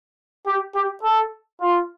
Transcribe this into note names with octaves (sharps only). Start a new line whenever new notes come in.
G4
G4
A4
F4